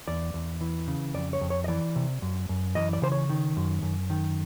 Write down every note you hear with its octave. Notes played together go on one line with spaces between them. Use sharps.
E2 D5
E2
E3
C#3
F2 D5
C#5
F2
C#5
D#5
E3 D5
C3
F#2
F#2
E3 D#5
D5
C#3 C5
C#5
D#3
F#2
F#2
D#3